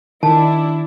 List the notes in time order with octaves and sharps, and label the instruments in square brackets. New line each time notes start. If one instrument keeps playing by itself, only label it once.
[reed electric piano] D#3 [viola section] D4 E4 [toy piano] A5